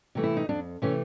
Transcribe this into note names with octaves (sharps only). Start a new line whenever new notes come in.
C3 E3 A3
E4
D#4
F2 D4
C3 E3 A3 C#4